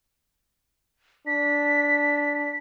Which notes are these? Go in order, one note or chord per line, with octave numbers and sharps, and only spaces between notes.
D4 B6